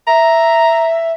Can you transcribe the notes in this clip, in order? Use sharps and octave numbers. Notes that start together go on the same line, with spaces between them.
E5 A#5